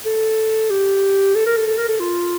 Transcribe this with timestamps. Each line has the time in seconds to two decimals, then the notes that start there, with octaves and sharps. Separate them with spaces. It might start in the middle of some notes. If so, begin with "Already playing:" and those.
0.06 A4
0.70 G4
1.35 A4
1.46 A#4
1.57 A4
1.67 A4
1.78 A#4
1.88 A4
2.00 F4